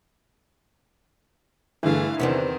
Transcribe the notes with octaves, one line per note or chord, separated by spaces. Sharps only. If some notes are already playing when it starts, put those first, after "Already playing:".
G2 D3 E3 A3 G#4 F5
E2 C3 D#3 B3 C4 D4